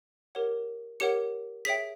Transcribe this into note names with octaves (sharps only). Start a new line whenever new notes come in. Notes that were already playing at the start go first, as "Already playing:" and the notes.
G4 A#4 C#5 F#5
G4 A#4 C#5 F#5 C#7
G#4 C#5 E5 G5 B6